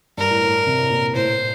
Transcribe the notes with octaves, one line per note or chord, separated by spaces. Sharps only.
G2 A#4
A2
A2
C3
A#2
A2 C5